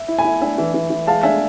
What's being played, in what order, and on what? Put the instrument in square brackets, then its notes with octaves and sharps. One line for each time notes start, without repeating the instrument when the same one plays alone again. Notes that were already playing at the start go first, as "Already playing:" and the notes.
Already playing: [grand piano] E5
[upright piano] E4
[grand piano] G#5 B5
[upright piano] E4
[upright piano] D4 [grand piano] E5 G#5
[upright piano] E3
E3
E3
[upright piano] G#3 [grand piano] F5 A5
[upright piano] D4 [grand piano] E5 G#5